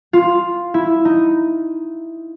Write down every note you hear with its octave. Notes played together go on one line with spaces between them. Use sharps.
F4
E4
D#4